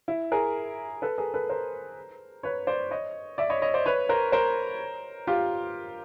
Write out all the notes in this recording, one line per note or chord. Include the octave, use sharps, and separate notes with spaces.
E4
G#4 A#4
A4 B4
G#4 A#4
A4 B4
A#4 C5
B4 C#5
C5 D5
C#5 D#5
D5 E5
C#5 D#5
C#5 D#5
C5 D5
B4 C#5
A#4 C5
A#4 C5
F4 G4